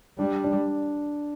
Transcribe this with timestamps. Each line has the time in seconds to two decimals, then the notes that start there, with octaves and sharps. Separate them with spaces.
0.19 G3 D4
0.44 D4